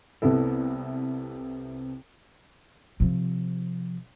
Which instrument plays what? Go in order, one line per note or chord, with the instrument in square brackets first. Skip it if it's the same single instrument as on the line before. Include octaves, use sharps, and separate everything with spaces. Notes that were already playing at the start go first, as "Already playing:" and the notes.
[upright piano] C2 C3 B3 E4 A4
[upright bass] C3 F3